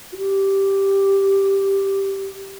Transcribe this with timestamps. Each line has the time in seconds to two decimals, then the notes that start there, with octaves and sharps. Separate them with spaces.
0.13 F#4
0.17 G4